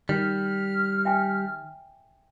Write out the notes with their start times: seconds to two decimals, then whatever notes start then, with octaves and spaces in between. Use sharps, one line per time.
0.09 D#3 G3 F6
1.05 E5 G5 G#5